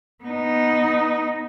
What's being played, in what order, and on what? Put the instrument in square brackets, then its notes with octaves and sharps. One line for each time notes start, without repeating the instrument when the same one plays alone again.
[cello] B3 D#4